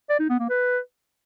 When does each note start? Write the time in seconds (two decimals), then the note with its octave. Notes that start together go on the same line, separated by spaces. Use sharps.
0.09 D5
0.19 D#4
0.29 B3
0.39 A#3
0.49 B4